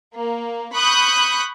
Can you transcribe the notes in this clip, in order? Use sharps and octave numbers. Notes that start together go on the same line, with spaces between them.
A#3
B5 C#6 D#6 F#6 G6